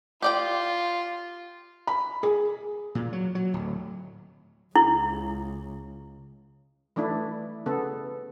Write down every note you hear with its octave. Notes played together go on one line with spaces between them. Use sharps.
F4 G4 D5 G5
B5
G#4
A#2
F#3
F#3
D1
C#2 E4
E3 A3 D4 E4
C#3 B3 A4